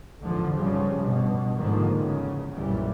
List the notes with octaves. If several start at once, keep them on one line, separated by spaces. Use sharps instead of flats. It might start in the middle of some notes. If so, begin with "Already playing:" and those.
E2 G#2 D3 F3
G2 C#3 F3 G3
G2 B2
G#2 D3 D#3 F3 A#3
E2 C#3
B1 F#2 A#2 E3 G3